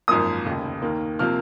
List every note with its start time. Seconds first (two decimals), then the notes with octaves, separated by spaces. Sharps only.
0.08 G#1 F#2 F3 A#3 D#6
0.46 F1 D#2 C#3
0.82 D#2 D#3 A#3
1.19 C3 F3 A#3 F6